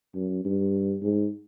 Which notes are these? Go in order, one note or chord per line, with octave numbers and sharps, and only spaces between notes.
F#2
G2
G#2